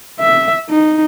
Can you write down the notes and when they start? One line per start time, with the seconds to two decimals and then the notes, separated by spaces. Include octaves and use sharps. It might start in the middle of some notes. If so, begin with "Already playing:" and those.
0.20 E5
0.70 D#4